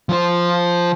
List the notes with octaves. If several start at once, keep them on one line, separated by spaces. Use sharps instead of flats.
F3 C5